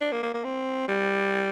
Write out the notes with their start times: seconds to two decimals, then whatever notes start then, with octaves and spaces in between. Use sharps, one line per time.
0.01 D4
0.12 A#3
0.23 A#3
0.34 A#3
0.44 C4
0.88 G3